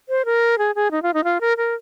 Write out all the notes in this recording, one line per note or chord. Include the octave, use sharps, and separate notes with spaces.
C5
A#4
G#4
G#4
D#4
F4
D#4
F4
A#4
A#4